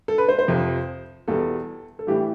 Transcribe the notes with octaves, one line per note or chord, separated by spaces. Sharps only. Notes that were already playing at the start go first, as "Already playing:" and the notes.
A4
B4
C5
C5
F2 C3 F3
E2 B2 G3 A4
A4
A2 E3 G3 G4